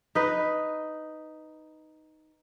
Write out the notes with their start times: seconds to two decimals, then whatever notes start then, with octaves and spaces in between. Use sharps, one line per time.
0.15 D#4 B4